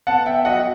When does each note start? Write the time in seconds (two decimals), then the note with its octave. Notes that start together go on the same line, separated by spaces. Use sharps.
0.07 B3 F#5 A5
0.26 E5 G5
0.45 F#3 D#5 F#5